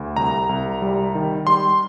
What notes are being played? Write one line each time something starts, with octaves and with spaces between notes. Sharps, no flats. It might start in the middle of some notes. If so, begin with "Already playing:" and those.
Already playing: D2
C2 A#5
C2
G3
D#3
G3 C6